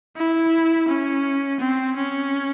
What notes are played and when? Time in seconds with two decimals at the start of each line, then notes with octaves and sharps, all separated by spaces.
0.17 E4
0.88 C#4
1.60 C4
1.96 C#4